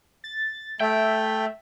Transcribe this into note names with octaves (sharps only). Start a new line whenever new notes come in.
A6
A3 E5 G5